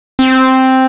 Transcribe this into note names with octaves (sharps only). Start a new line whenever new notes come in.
C4